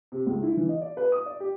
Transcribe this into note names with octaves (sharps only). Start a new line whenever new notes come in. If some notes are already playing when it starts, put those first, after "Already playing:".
C3
C#2
E4
E3
D#5
D5
B4
D#6
D5
G4